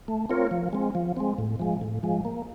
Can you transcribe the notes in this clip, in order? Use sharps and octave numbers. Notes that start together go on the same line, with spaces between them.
A3
C4 F4 A#4 C#5
F3
G#3 C4
F3
G#3 C4
A2
F3 G#3
A2
F3 G#3
A#3